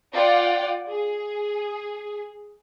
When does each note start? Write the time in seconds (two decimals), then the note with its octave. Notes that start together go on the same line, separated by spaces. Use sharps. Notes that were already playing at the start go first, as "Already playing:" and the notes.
0.13 F4 D5 F#5 G5
0.88 G#4